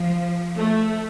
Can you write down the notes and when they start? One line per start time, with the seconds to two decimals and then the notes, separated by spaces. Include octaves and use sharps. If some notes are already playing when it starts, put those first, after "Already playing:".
Already playing: F3
0.57 A3